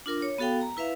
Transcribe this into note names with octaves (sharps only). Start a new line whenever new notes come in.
D4 F4 A#4 D6
C#5
B3 F#4 A4 F5 G5
A#5
E4 B4 E5 F5